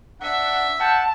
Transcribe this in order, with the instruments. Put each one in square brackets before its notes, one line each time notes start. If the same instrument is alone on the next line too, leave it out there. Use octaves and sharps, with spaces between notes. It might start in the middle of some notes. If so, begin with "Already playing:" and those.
[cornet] D4 [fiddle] E5 [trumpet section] F#5
[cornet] F#5 [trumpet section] G5 [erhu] A5